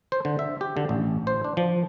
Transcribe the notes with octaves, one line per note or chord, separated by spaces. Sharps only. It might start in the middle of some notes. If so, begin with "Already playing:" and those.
C5
D3
E5
G4
D3
A1
C5
D4
F3